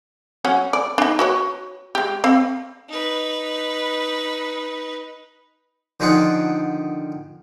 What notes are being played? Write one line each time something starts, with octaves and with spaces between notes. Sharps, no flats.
F#3 C#4 F#5
D5
D4 D#4
F#4 B4 C#5
G#3 G4
C4 F5
D#4 B4
D3 D#3 F3 F4 G#4 F#5